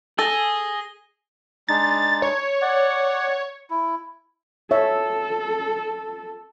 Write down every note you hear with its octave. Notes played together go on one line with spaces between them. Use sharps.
G#4 A4 A#6 G7
G#3 D4 D#4 A6
C#5
D5 F#5
E4
A4 C#5 E5